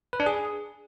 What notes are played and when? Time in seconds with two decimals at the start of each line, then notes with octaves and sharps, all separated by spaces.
0.13 B4
0.20 D4
0.26 G#4